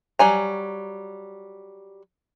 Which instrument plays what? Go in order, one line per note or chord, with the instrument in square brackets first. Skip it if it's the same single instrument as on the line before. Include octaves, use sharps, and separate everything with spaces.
[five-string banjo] F#3 G3 G#5 A#5